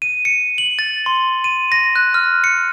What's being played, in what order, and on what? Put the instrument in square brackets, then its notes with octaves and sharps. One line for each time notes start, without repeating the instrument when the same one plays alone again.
[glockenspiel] D#7
C#7
F#7
A6
C6
D#7
A#6
F#6
F6
C#7